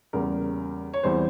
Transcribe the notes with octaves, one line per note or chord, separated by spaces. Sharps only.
E2 C#3 G3 A#3 A#4
C#5
E2 E3 G3 C4 C5